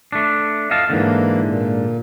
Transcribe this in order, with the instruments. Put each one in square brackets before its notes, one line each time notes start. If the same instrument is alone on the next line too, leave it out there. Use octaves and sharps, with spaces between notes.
[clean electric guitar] A3 D4
D#5 F5 A5
[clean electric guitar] G#2 D3 [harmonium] E3 A#3
[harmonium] A#2